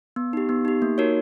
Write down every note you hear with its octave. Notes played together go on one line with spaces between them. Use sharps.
B3
D#4 G4
B3
D#4 G4
A#3
D#4 F#4 A#4 C#5